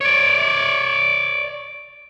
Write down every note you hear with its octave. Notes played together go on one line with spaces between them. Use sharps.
C#5 D5